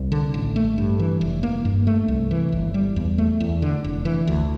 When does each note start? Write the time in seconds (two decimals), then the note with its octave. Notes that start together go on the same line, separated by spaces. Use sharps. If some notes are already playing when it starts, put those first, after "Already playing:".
Already playing: C2
0.12 D3
0.34 A1
0.56 A3
0.78 G2
0.99 E3
1.21 F1
1.43 A#3
1.65 G2
1.87 A3
2.08 C2
2.31 E3
2.52 G1
2.74 G3
2.96 E2
3.18 A3
3.40 E2
3.62 D3
3.84 F1
4.05 E3
4.27 D2